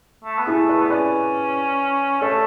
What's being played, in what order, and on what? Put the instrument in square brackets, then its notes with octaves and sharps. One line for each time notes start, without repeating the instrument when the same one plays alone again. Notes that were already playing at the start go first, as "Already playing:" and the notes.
[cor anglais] A3
B3
[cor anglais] A3 [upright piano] E4 G#4
[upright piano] G#4 B4
[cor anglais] B3
[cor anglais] C#4 [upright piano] B4 D5
[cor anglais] A3 [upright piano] A4 C#5